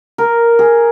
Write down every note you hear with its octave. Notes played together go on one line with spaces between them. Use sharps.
A#4
G#4